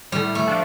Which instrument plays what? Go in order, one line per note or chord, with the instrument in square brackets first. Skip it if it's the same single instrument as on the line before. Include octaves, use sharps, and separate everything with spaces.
[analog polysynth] A2 [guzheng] G3
[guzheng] A3
[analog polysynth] F3 D4